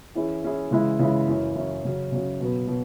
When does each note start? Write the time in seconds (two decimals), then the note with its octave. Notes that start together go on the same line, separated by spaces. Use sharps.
0.15 E3 C#4 E4 G#4
0.43 E3 C#4 E4 G#4
0.71 C#3 E3 G#3 E4
0.99 C#3 E3 G#3 E4
1.27 F#2 E3 C#4
1.56 F#2 E3 C#4
1.84 C#3 F#3 C#4
2.12 C#3 F#3 C#4
2.40 B2 F#3 B3
2.67 B2 F#3 B3